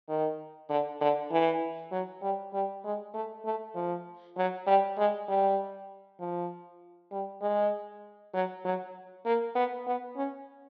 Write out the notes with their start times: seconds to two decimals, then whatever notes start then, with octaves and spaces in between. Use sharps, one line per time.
0.09 D#3
0.70 D3
1.01 D3
1.31 E3
1.92 F#3
2.22 G3
2.53 G3
2.84 G#3
3.14 A3
3.45 A3
3.75 F3
4.37 F#3
4.67 G3
4.98 G#3
5.29 G3
6.20 F3
7.12 G3
7.42 G#3
8.34 F#3
8.65 F#3
9.26 A#3
9.55 B3
9.87 B3
10.17 C#4